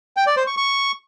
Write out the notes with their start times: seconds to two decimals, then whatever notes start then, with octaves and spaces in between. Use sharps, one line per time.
0.17 G5
0.27 D5
0.37 C5
0.47 C#6
0.57 C#6